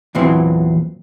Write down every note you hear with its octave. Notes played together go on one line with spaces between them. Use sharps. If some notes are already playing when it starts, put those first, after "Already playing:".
E2 A#2 E3 F#3 C4